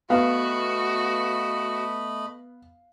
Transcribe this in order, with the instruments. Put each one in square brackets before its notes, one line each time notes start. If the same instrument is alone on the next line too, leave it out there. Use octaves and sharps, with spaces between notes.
[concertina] A3 D#5 B5 [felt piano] B3 [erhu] F#4 [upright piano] F5